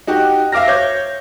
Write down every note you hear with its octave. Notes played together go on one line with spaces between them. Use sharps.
D#4 F#4 G4
E5 F5 D6 F6 A#6
C#5 G6